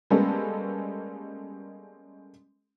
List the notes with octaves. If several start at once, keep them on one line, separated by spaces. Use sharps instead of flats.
G3 G#3 A#3 B3 C#4 A4